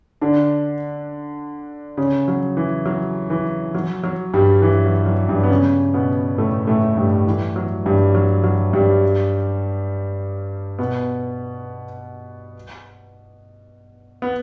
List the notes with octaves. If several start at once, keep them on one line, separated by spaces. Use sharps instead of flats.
D3 D4
C#3 C#4
F#3
E3
F#3
E3
F#3
F#3
G2 G3
E3
F#3
F#3
G2 G3
B3
C#3 C#4
B2 B3
A2 A3
A2 A3
G2 G3
E3
F#3
G2 G3
F#3
F#3
G2 G3
B2 B3
B3